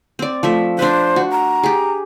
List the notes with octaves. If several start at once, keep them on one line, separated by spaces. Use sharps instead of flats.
C4 D5
F3 A3 E5
D4 B4 C5
F#4
A#5
G4 G#4